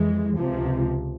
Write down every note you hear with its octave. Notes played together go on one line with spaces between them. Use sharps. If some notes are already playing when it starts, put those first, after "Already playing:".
Already playing: F2 E3 G#3
C#2 C3 F3